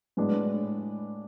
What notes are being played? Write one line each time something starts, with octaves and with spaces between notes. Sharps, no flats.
A2 G#3 B3 D4